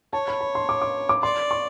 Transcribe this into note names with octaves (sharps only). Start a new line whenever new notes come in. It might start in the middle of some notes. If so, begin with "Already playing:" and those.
C#5 A5
B5
B5
C6
D6
D6
D6
D5 C6
C#6